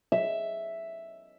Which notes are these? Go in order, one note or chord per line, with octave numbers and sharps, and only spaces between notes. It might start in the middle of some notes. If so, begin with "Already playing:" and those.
E5